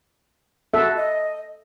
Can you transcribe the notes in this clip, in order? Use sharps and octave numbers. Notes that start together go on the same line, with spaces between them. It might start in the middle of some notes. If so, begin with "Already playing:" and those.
F#4 A4 E5
D#5